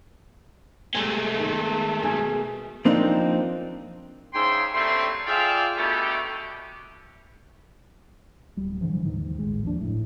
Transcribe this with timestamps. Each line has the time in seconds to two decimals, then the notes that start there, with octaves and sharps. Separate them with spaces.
0.95 C3 G#3 A3
1.39 D#3
2.02 B2 G#4
2.85 F3 A#3 C4 D4 D#4
4.34 G#2 C#3 E5 G5 C6
4.73 G3 A3 A#3 C4 D4 C6
5.26 F4 G#4 D5 E5 F5 G5
5.76 B2 A3 D4 D#4 G4
8.56 D1 G3
8.81 G#2 D3 E3 F3
9.05 D#2 G#2 D#3
9.39 A1 G#3
9.63 F1 D#2 F3 D4
9.81 G1 A2